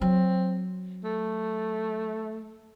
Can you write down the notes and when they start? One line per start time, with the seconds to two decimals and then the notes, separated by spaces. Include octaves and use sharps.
0.01 F#3 C4
1.04 A3